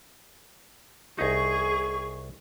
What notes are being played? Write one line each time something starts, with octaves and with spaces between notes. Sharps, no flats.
C2 D#4 G#4 C#6